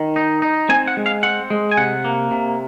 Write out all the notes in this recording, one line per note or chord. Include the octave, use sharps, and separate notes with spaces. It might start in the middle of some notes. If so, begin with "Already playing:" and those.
Already playing: D#3
D#4
D#4
C4 G#5
F#5
G#3
F5
C4 F#5
G#3
G#5
C3 F#5
A#3
C3